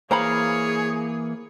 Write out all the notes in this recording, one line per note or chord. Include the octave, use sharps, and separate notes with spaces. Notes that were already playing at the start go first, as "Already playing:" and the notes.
E3 A#3 G#4 C5 C#5 F5 A#5 B5